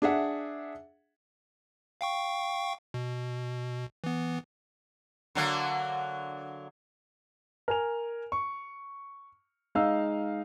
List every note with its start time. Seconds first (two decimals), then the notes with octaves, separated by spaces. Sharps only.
0.02 D4 G#4 E5 F#5
2.01 F5 G5 C#6
2.94 B2
4.04 E3 B3
5.35 D3 F#3 A#3
7.68 A#4 G#5 F7
8.32 C#6
9.75 G#3 D#4 F5 E6